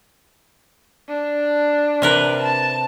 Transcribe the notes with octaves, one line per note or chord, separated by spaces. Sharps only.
D4
C3 A#4 B4
A5